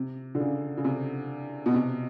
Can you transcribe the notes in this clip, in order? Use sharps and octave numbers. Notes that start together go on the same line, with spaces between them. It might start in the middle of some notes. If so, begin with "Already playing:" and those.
Already playing: C3
D3
C#3
C#3
C3
B2
C3